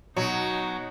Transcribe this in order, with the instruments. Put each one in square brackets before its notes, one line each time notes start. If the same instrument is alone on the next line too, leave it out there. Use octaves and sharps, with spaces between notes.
[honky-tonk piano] B2 [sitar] F#3 [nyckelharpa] D#4